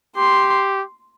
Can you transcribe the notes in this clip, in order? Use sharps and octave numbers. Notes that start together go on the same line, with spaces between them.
G4 C6